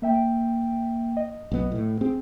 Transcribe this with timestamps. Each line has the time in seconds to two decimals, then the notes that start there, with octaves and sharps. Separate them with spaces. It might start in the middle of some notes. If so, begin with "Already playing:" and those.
0.02 A#3 E5 G5
1.17 D#5
1.52 B1 B3
1.72 A2
2.01 C4 G#4